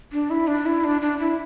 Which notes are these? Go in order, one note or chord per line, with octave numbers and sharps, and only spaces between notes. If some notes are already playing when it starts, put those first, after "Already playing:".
D4
E4
D4
E4
D4
D4
E4